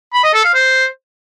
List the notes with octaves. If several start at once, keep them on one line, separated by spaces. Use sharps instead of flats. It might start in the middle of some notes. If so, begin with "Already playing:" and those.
B5
D#5
A4
F5
C5